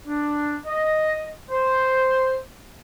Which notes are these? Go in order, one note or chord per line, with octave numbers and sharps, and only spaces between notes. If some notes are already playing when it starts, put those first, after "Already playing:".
D4
D#5
C5